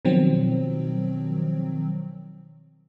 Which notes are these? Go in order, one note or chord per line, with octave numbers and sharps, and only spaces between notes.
B2 D#3 F3 F#3 C4